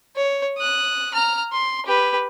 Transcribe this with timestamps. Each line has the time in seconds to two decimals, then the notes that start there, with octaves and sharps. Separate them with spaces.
0.16 C#5
0.58 D#6 F#6
1.14 A#5 F6
1.52 C6
1.87 G4 B4